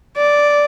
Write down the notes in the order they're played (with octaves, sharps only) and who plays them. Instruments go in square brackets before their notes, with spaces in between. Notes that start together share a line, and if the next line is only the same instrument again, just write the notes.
[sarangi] D5